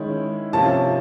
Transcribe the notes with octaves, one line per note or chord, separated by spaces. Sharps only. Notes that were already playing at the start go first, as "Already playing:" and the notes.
Already playing: D#3 G#3 C#4 E4
C3 F3 A#3 C#4 A5